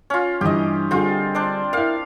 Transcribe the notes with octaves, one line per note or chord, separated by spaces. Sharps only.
C#4 F4
G2 E3 G4 D#5
D3 G3 C4 F4 G#4
D4 C5 D5
E4 A#4 F5